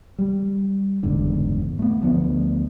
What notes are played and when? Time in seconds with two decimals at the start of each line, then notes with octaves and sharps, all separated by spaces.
0.19 G3
1.03 F#1 E2 G#2 D3
1.79 A3 B3
2.02 D2 F3 A#3 B3